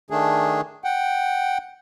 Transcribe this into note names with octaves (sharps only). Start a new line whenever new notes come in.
D#3 A3 D4 G#4
F#5 G5